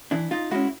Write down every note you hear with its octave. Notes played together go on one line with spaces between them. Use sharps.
E3 D4 E4
D#4 F4
G#3 C#4 E4 F#4